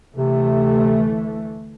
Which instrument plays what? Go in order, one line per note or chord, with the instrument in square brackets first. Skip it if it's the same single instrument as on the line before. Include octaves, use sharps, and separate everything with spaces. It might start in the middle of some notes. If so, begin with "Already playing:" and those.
[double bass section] D2 E3 A3 [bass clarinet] C3